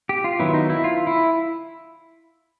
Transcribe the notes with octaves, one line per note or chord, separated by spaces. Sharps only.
G4
F4
D#3 F#3 B3 E4
D#4
E4
F4
E4